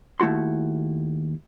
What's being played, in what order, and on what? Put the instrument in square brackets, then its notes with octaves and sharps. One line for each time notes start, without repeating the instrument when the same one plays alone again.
[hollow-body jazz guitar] D#2 A3 E4 F#4 C6